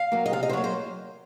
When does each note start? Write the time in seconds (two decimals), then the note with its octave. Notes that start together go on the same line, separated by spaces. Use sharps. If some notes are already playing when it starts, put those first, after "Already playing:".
Already playing: F5
0.12 F#3 A#3
0.26 D#5
0.33 C3 F5
0.43 D#5
0.49 C5
0.53 F#3 A#3 C#5
0.64 C5